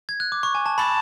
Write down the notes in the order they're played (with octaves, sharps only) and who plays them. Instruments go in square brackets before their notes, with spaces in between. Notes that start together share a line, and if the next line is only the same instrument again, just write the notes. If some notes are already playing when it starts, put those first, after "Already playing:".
[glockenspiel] G#6
F#6
D6
C#6
G#5
A5
[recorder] A5 [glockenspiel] B5